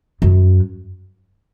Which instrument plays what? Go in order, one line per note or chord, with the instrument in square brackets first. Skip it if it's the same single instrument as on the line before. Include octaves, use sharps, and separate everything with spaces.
[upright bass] F#2